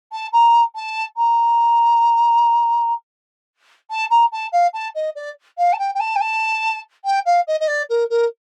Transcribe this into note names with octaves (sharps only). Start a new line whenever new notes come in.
A5
A#5
A5
A#5
A5
A#5
A5
F5
A5
D#5
D5
F5
A5
G5
G5
A5
G5
A5
G5
F5
D#5
D#5
D5
A#4
A#4